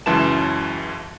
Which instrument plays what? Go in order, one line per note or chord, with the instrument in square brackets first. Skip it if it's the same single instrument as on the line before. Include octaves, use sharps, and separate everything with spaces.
[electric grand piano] C#2 F#2 E3 F#3 A5 E7